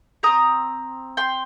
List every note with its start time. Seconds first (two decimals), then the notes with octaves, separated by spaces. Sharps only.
0.23 C4 G4 A#5 D#6
1.17 G5 C6